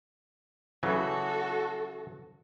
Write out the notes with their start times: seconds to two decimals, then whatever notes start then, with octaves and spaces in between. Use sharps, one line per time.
0.83 C#3 E3 F#3 F#4 A4